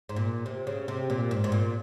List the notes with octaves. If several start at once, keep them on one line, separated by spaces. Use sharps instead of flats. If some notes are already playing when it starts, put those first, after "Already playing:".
G#2
A#2
C3
C#3
C3
A#2
G#2
G#2
A#2